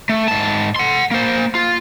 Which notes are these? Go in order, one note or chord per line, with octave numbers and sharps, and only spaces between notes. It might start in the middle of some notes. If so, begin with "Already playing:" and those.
A3
G#2 A5
F#5 C6
A#3 C5
F4